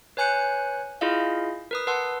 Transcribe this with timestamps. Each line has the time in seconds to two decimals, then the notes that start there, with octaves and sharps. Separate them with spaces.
0.17 B4 C#5 G#5 F#6 G6 C#7
1.01 E4 F4 G#4 D#5 F5
1.71 A#4 B4 D#6
1.87 B4 F#5 A5 C6 E6